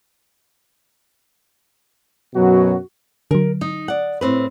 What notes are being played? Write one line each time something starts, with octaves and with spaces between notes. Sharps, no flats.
F#2 B2 F#3 F#4
D3 F#3 A#4
D#4
D5 F#5
A2 C4 B4